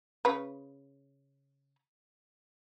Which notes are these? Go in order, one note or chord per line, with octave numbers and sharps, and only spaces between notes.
C#3 B4